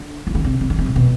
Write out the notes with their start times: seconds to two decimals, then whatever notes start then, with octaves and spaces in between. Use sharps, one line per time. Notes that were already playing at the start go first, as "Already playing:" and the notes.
Already playing: D3
0.27 E3
0.35 D3
0.44 C3
0.61 C3
0.70 D3
0.79 C3
0.86 A2
0.96 B2